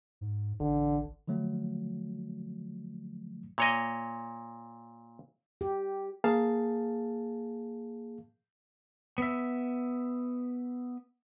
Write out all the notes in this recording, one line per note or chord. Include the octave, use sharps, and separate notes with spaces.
G#2
A1 D3
D3 F3 F#3 A3
A#2 C#5 D#5
G4
A#3 G#4 F5 A5
B3 E5